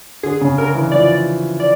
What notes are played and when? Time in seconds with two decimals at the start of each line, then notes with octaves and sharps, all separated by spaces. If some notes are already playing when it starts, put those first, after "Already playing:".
0.23 D3 G#4
0.41 C#3
0.58 D3 A#4
0.74 E3
0.92 F3 D5
1.60 D5